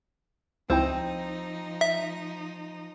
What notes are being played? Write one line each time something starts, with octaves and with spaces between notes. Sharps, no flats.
C#2 F3 C4 D#4 E4 G5
E5